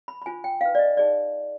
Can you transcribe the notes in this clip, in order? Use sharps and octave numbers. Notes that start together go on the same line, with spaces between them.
B5
B5
D4 F4 C5 G#5
G5
D#4 B4 F5
D5
D#5
D#4 G#4 C5 D5